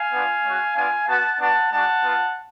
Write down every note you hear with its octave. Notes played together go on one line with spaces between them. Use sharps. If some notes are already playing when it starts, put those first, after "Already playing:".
Already playing: F5 G#5
B3 D4 F4
G#3 C#4 F#4
B3 D4 F4 F5 G#5
B3 F#4 F#5 A5
B3 D4 F#4 F#5 A5
G#3 D4 F#4 F#5 A5
B3 F4